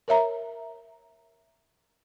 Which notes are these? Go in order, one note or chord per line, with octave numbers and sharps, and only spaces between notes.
A#4 C#5 E5 A#5